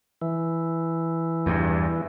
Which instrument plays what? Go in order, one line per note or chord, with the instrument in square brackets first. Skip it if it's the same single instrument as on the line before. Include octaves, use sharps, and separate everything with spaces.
[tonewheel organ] E3
[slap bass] E2 G2